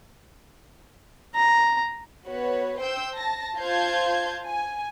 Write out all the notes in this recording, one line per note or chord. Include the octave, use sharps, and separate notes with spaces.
A#5
B3 F#4 B4 C#5
C5 G5 E6 G6
A5 A#6
F4 C5 F5 A5 G6 G#6
G#5